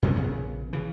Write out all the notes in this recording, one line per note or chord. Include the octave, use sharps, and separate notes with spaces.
F#2 C3 G#3 C#4
A#1 C#3 B3
C#3 E3